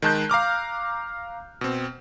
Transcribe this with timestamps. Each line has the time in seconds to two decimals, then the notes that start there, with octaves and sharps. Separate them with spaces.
0.02 D#3 G#3 A5 F#6 G6
0.30 F5 A#5 D6 F6
1.61 B2 C4